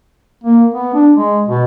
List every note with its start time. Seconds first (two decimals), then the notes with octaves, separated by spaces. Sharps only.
0.44 A#3
0.74 B3
0.94 D4
1.16 G#3
1.49 B2